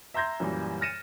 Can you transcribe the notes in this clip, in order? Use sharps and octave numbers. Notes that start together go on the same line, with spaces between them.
E5 A#5 C6 G6 G#6 A#6
F#2 A#2 E3 G3
F6 A6 A#6 C#7 D#7 E7